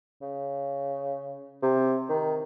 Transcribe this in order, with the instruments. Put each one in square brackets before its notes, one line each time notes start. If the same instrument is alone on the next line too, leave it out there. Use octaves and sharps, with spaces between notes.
[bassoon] C#3
C3
D#3